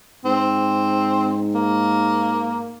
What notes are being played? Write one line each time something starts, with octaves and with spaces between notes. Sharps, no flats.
G#2 C4
A#3